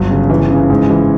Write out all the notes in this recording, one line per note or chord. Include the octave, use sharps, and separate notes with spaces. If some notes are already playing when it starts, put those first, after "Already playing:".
Already playing: G1 F#3
C#3
E3
C#3
G#2
E3